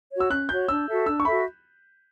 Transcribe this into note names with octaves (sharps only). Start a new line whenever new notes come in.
F#4 C#5
E6
C#4 F#6
F#4 C#5 G6
D4 E6
F#4 A4 E5
D4 E6
C#6
F#4 A4 E5 B5